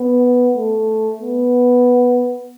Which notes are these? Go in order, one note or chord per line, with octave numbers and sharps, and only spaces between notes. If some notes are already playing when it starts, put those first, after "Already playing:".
Already playing: B3
A3
B3